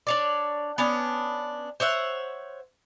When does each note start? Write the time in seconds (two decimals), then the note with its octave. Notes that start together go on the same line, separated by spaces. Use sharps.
0.07 D4 C#5 D5
0.78 B3 C#4 D4
1.80 C5 C#5 E5 F#5